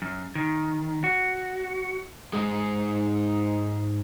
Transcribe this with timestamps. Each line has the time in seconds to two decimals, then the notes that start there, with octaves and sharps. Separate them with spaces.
0.02 F#2
0.35 D#3
1.04 F#4
2.33 G#2 G#3